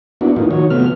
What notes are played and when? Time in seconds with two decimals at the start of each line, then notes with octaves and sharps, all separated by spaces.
0.21 A#3 B3 D4 E4 F#4
0.36 A2 F3 A#3 D#4 F4
0.51 D#3 F#4 C#5
0.70 C3 F3 A3 B3 F6